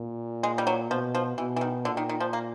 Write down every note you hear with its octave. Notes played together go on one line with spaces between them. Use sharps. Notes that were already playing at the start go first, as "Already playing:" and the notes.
Already playing: A#2
G#3
G3
F#3
B2 F3
F3
B2 E3
E3
D#3
A#2 D3
D#3
D#3
F3
A#3